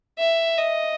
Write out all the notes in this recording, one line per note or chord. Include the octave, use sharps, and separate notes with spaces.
E5
D#5